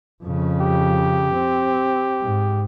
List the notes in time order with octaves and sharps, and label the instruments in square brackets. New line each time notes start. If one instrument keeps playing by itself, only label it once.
[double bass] F2 C#3
[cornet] G4
[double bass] C4
G#2